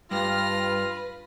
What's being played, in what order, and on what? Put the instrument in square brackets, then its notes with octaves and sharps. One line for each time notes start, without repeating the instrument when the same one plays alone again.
[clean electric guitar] G2 [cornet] F4 [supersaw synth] B4 [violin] F6 A#6